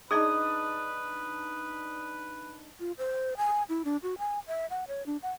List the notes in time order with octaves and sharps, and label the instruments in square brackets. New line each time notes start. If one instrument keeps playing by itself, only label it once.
[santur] D4 D#4 [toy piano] G#4 D5 D#5 [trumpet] B4 [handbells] D#6
[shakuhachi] F4
C5
G#5
E4
D4
F#4
G#5
E5
F#5
C#5
D4
F#5